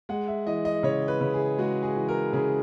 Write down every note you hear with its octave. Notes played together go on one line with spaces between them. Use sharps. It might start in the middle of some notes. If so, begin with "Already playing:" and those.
G#3 F#5
E5
E3 D#5
D#5
C#3 C#5
B4
C#3
G#4
G#3 F#4
G#4
E3
A#4
C#3 G#4